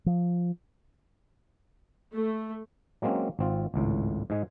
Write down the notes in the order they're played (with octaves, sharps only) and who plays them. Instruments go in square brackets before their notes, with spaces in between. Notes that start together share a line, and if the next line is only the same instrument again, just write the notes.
[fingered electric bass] F3
[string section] A3
[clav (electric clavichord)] F#3 G#3 A#3 C4 C#4
G#1 C4 F4
G#1 C#2 A2
G#2 G#3 G#5